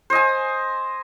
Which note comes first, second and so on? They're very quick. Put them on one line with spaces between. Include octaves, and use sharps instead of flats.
C5 D#5 G#5